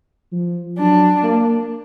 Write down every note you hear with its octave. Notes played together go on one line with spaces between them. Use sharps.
F3
F#3 D4
A#3